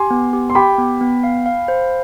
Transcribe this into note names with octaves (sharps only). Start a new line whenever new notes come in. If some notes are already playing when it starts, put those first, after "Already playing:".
Already playing: G4 G#5 C6
B3
G4
C6
G4 G5 B5
B3
B3
F5
F5
C5